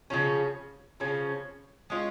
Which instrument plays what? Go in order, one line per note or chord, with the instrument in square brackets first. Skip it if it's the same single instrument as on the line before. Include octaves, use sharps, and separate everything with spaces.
[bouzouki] C#3 F3 C#4
C#3 F3 C#4
G#3 C#4 F4